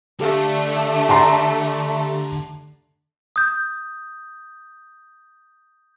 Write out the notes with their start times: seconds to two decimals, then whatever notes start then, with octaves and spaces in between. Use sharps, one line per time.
0.20 D3 A3 D4 G4 A4 F5
1.09 A5 A#5 C6
3.36 D#6 G6